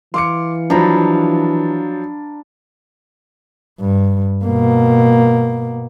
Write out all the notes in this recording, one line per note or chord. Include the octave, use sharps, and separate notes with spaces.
E3 F5 C6 D6 C#7
F3 F#3 D4 A#5 B5
G2
B2 A#3